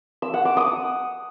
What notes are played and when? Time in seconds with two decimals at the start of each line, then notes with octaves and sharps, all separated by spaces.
0.22 E6
0.34 F#5
0.45 D6
0.57 D#6